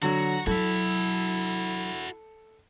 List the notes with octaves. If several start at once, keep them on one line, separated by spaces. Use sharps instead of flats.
D3 F#3 F#4 A#5
F#3 E4 F#4 A4 E5